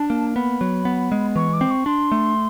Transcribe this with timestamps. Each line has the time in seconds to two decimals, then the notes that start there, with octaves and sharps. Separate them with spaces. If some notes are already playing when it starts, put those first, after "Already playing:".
Already playing: D4 A5
0.10 A#3
0.35 B3 B5
0.61 F#3
0.85 B3
1.12 G#3
1.36 E3 C#6
1.53 D6
1.61 C4
1.70 C#6
1.86 D4 C6
2.12 A3